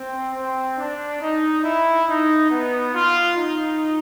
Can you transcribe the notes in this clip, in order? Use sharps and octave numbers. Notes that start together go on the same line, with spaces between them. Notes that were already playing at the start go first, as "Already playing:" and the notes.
Already playing: C4
C4
D4
D#4
E4
D#4
B3
F4
D#4